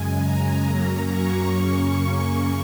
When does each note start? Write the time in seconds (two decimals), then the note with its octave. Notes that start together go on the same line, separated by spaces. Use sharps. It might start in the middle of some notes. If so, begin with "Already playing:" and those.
Already playing: F#2 C#3 G#3 G#5
0.19 A#5
0.63 F#2 F#3 A#3 C#4 A#5
1.07 C#6
1.51 F#2 C#3 A#3 C#4
1.95 C#6